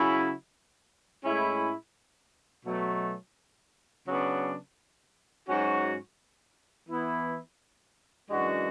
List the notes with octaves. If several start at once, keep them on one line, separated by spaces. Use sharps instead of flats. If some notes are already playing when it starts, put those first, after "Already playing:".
Already playing: C#3 F#3 C#4 E4
A2 G#3 C#4 E4
B2 F#3 A3
C#3 F#3 B3 D4
G#2 F#3 C#4 F#4
E3 B3 E4
F#2 E3 G#3 D4 F#4